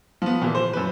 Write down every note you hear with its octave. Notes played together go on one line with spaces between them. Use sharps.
F3 B3
A#2 E3
C5
F#2 B4